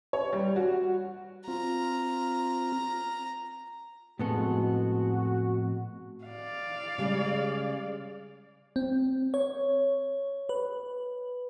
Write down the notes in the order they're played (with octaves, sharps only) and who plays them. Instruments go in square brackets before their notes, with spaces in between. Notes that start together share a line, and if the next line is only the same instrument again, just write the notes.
[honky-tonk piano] C#5
G3
F#4
[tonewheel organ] C4 F4 [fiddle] A#5
[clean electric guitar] F2 G#3 [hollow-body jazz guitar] A2 B3 A4 [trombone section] F#4
[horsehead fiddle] D5 F5
[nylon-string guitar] C#3 G3 G#3
[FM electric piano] C4
C#5
B4